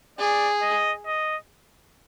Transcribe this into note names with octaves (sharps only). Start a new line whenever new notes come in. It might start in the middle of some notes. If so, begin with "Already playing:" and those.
G#4 D5
D#5
D#5